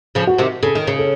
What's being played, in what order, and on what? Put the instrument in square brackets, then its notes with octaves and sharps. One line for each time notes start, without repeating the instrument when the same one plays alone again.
[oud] C#3 F3
[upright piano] F#4
[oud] C3 D#3
[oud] C#3 [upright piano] A4
[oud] D#3
C#3
[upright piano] A4